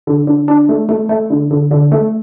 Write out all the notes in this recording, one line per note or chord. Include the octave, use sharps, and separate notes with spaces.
D3
D3
D4
A3
A3
A3
D3
D3
D3
A3